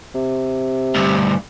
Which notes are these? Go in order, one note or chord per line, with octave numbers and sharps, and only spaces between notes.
C3
D2 G2